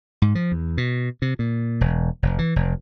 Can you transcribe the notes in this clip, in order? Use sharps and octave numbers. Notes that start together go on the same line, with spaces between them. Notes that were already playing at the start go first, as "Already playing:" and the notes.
G#2
F3
E2
B2
C3
A#2
E1
F1
E3
F1